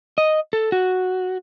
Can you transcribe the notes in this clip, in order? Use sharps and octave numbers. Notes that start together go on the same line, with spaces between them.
D#5
A4
F#4